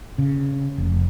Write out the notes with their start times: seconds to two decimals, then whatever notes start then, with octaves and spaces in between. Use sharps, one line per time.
0.18 C#3
0.78 F1